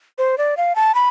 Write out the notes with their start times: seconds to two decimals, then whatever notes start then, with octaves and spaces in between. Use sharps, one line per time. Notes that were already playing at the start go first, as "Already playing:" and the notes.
0.18 C5
0.38 D5
0.57 F5
0.76 A5
0.95 B5